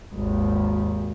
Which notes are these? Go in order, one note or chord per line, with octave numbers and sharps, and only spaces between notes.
G#1 D#2